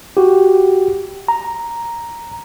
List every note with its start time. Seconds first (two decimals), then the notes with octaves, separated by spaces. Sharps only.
0.17 F#4 G4
1.28 A#5